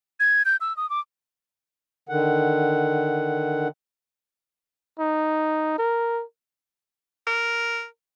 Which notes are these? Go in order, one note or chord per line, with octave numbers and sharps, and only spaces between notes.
G#6
G6
E6
D#6
D6
D3 D#3 F#5
D#4
A#4
A#4